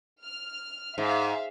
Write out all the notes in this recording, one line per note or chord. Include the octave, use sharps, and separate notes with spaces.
F6
G#2 E5 F5